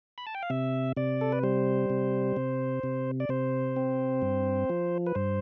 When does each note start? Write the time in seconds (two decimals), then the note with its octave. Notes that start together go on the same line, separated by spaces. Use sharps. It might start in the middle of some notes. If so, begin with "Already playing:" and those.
0.18 B5
0.27 A5
0.35 G5
0.43 F5
0.50 C3 E5
0.97 C3 D5
1.21 A4
1.32 B4
1.43 G3 C5
1.90 C3
2.37 C3
2.83 C3
3.20 D5
3.29 C3 C5
3.76 C4
4.22 G2
4.69 F3
5.07 B4
5.15 G2 C5